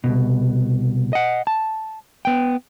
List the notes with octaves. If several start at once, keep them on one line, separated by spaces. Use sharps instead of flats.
C2 F2 B2
D#5 F#5
A5
B3 G5